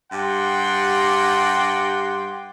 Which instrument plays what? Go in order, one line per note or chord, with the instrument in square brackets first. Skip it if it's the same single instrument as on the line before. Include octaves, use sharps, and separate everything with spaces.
[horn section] G2 G4 F#5 G5 C6